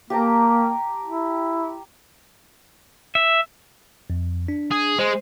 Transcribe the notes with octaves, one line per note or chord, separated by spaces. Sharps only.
A#3 G4 A5 A#5
E4
E5
F2
D4
G#4
G#3 C5